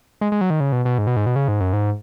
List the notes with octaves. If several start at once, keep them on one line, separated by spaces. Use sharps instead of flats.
G#3
G#3
F#3
D#3
C#3
B2
B2
G#2
B2
G#2
B2
C#3
G#2
F#2
G#2